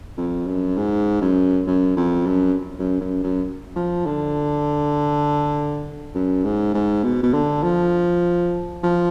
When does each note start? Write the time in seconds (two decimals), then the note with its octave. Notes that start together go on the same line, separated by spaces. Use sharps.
0.18 F2
0.47 F#2
0.77 G#2
1.22 F#2
1.67 F#2
1.97 F2
2.26 F#2
2.79 F#2
3.01 F#2
3.24 F#2
3.76 F3
4.06 D3
6.15 F#2
6.44 G#2
6.74 G#2
7.03 B2
7.23 B2
7.34 D3
7.63 F3
8.83 F3